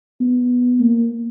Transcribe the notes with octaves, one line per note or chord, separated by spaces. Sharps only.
B3
A#3